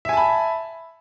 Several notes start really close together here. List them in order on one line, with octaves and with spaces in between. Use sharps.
E5 G#5 A5 B5